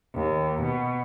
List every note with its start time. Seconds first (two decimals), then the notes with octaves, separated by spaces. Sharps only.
0.14 D#2
0.63 B2